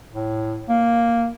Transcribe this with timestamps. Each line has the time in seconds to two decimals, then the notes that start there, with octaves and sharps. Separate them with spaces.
0.13 A2
0.69 A#3